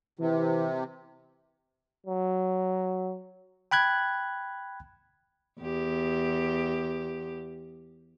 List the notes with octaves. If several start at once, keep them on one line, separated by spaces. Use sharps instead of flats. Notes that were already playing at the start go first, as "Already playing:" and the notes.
C3 E3
F#3
G5 B5 F#6 G#6
E2 G4